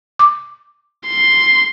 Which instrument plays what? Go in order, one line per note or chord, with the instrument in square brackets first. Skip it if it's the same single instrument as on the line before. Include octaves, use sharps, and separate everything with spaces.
[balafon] D6
[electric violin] C6